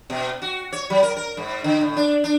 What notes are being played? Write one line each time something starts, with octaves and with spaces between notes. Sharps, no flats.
B2
F#4
C#5
F#3
A#4
A#4
G#2
D3
A2
D4
D4